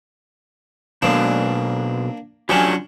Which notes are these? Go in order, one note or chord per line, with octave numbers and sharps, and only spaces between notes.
B2 F#3 A#3 D4 C5
F#3 C#4 D4 F4 G4 G#5